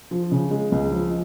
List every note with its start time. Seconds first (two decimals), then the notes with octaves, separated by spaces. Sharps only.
0.11 F3
0.31 C#3
0.51 G#3
0.72 C#2
0.91 F3